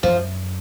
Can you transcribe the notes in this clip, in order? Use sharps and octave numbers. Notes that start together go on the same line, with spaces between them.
F#2 F3